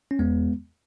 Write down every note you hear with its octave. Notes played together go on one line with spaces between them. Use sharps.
C#4
E2 G#3 B3